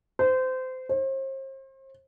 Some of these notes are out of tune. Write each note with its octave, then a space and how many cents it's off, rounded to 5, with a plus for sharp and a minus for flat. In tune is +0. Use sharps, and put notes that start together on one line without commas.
C5 -25
C5 +40